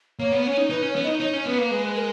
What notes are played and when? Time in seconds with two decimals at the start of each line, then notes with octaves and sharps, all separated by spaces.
0.19 A#3 C#5
0.32 B3
0.44 C#4 C#5
0.57 D#4
0.70 D#4 B4
0.82 C#4 C#5
0.96 B3
1.03 D#4 D#5
1.20 D#4 C#5
1.33 C#4
1.45 B3 B4
1.58 A#3
1.71 G#3 B4
1.96 A#4